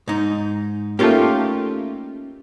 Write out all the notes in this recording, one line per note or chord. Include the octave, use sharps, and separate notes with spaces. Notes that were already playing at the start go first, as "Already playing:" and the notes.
G#2 D#4
A3 A#3 C#4 D#4 F4 G4